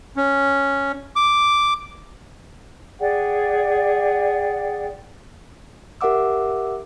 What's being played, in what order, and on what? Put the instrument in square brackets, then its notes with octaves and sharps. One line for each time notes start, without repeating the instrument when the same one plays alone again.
[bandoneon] C#4
D6
[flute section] G#4 D5 F#5 G5
[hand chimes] G4 A#4 E5 F#5 D6 E6